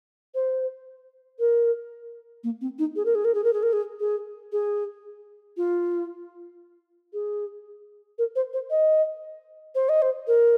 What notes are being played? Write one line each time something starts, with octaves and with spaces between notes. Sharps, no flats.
C5
A#4
A#3
C4
D#4
G#4
A#4
G#4
A#4
G#4
A#4
G#4
A#4
G#4
G#4
G#4
F4
G#4
A#4
C5
C5
D#5
C5
D#5
C5
A#4